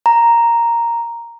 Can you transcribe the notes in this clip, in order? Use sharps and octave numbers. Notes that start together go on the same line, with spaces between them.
A#5